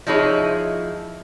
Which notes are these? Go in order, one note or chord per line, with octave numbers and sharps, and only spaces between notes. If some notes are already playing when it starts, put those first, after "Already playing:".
F3 D#4 E4 G#4 C#5